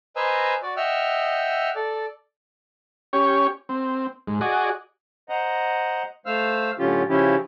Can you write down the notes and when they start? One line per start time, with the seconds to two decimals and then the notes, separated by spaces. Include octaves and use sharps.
0.16 B4 C5 D#5 G#5 A#5 E6
0.63 F#4 D5
0.77 D#5 E5 F#5 G5 E6 F6
1.75 A4 D5
3.13 C#4 G4 C#5
3.69 C4
4.28 G#2
4.41 F#4 G#4 D5 D#5
5.29 C5 D#5 F#5 A#5
6.26 A3 C5 F5 E6 F6
6.79 A2 D3 F#3 C#4 F4 G4
7.09 C#3 F3 C#4 E4 G4